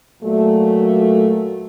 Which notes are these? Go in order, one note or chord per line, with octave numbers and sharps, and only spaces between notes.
A#2 F#3 A3